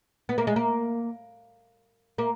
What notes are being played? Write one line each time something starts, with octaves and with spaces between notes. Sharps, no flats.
B3
A#3
G#3
A#3
A#3